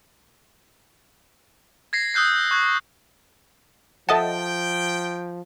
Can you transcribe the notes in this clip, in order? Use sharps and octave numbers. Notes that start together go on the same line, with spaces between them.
G#6 A#6 C7
D#6 E6 F#6 G6 C7
C#6 F#6 G#6
F3 A4 D#5 E5 F#5 G5 A5